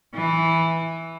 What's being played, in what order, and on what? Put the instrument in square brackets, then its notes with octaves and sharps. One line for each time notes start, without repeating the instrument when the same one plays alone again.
[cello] E3